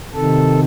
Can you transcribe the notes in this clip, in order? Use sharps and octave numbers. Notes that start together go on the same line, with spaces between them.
C3 D#3 A4